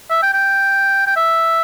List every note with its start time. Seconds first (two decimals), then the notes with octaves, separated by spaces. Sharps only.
0.10 E5
0.23 G5
0.34 G5
1.07 G5
1.16 E5